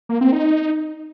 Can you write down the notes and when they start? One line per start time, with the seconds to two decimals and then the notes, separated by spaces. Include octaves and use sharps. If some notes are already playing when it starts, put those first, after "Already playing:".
0.09 A#3
0.21 C4
0.32 D#4